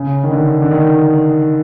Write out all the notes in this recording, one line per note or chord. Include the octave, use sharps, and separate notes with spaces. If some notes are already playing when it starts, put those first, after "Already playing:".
Already playing: C#3
D#3
D3
D3
D#3